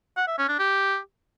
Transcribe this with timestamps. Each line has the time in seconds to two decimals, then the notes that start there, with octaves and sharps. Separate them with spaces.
0.17 F#5
0.28 E5
0.38 C#4
0.49 D4
0.59 G4